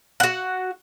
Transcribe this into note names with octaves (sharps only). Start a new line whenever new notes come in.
F#4 F#5